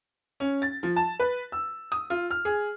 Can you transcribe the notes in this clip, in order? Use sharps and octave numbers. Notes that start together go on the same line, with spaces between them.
C#4
A6
F3
A5
B4
E6
D#6
F4
F6
G#4